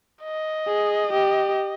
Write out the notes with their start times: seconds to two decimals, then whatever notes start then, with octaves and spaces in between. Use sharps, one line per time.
0.23 D#5
0.67 G#4
1.13 G4